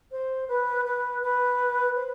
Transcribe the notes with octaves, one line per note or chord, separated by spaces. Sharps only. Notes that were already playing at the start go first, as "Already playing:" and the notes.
C5
B4
B4
B4
C5